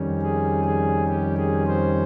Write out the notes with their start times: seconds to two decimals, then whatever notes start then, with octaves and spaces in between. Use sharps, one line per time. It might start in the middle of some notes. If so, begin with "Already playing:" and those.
Already playing: F2 D#3 G3 C#4
0.22 G#4
0.65 G#4
1.08 G4
1.37 G#4
1.67 C5